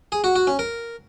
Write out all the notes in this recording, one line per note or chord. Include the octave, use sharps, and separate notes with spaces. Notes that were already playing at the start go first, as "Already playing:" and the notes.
G#4
F#4
F#4
C#4
A#4